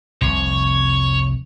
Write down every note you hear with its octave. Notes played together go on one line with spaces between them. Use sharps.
F1 C2 C#5